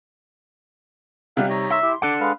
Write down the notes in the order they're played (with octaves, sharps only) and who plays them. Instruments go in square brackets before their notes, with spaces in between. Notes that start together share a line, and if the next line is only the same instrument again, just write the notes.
[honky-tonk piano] C3 G3 [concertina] F5 F#5
[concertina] D#4 C#5 D#5
[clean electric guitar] E5 [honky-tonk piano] C6
[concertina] E4 G4
[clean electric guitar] D4 A4 F#5 [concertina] D6
[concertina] G#3 B4 F5